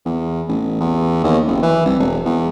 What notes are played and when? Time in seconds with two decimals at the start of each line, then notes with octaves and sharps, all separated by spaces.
0.05 E2
0.49 A1
0.80 E2
1.24 D#2
1.47 F#1
1.63 E3
1.85 C2
1.99 E1
2.25 E2